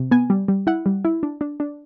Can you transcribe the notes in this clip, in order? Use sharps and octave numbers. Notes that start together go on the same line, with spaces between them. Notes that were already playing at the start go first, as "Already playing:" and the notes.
Already playing: C3
B3 G#5
G3
G3
E4 F#5
G3
E4
D4
D4
D4